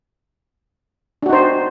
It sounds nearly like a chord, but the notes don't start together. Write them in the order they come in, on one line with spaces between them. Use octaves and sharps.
D4 F#4 D#4 C5